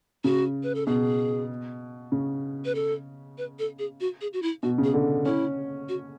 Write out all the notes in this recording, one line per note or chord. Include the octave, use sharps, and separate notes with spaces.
C#3 F#4
B4
A4
B2 G#4
C#3
B4
A4
B4
A4
G#4
F#4
G#4
F#4
E4
B2 F#4
C#3
G#4
D3
C#4 E4
F#4